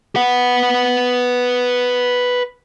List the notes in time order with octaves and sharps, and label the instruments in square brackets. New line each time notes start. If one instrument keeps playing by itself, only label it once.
[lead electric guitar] B4 F#5